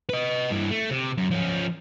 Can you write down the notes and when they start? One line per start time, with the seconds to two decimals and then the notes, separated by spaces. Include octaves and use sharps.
0.10 B4 D#5
0.51 G2 E3
0.71 A3
0.90 C3
1.18 F#2
1.31 F3 C#4